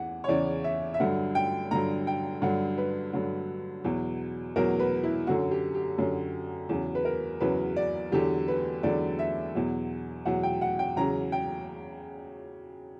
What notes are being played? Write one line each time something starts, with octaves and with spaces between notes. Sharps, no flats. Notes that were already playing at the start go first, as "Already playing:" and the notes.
Already playing: E2 E3 F#5
C#5
E2 C#3 E3 D5
E5
E5
G2 D3 F#3 F#5
G5
G2 D3 F#3 A#5
G5
G2 D3 F#3 F#5
B4
G2 D3 F#3
E2 B2 F#3
E2 B2 F#3 A#4
B4
E4
F#2 D3 F#3 F#4
G4
G4
F#2 D3 F#3
E2 C#3 F#3
B4
A#4
E2 C#3 F#3 B4
D5
E2 D3 F#3 G4
B4
E2 D3 F#3 D5
E5
E2 B2 F#3
E2 B2 F#3 F#5
G5
F#5
G5
E2 C#3 F#3 A#5
G5